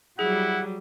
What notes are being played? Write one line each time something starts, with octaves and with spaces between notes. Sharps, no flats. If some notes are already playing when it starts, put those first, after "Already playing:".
F#3 G3 E4 G#4 F#5